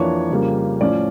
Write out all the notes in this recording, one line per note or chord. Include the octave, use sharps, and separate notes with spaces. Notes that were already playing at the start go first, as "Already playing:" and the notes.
Already playing: F2 E3 A#3 D4 C#5
F2 C#3 G3 A#3
A2 F3 C#4 D5